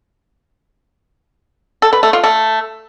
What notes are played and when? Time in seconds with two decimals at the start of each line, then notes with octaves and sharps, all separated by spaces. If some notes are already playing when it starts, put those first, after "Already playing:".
1.82 A4
1.93 B4
2.03 A3
2.13 F4
2.23 A3